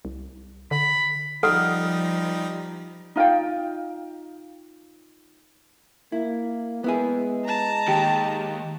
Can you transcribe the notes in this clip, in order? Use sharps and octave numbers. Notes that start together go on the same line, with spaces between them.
C2
D3 B5
F3 G3 D#4 A4 F#5 F6
D#4 F4 F5 G5
A#3 E4
G#3 B3 E4 G#4
A5 A#5
D#2 D#3 G4